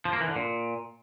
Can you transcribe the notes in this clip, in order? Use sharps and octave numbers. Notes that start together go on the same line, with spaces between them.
F3
A#3
E3
D3
A#2